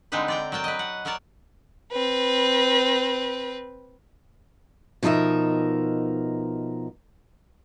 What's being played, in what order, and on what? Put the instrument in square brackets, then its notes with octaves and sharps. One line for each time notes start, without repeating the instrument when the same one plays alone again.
[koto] D3 G#3 C4 D#4 B4
D5 G5 A#5
F#3 A#4 G5 A5
B4 D#5
F#5
F#3 A#4 C#5 D5 A5
[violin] C4 B4
[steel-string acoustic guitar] B2 F3 D#4 A4 A#4 E5